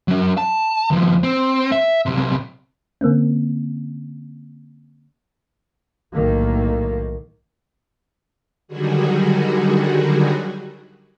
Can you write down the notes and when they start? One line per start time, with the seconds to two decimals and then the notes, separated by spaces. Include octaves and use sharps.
0.08 F#3 C#4
0.38 A5
0.91 D#2 F3
1.23 C4
1.72 E5
2.06 B1 C3
3.01 D3 A#3 C4 C#4
6.13 B1 A2 D#3 A#3
8.68 D3 D#3 F#3 G3 F#4 G#4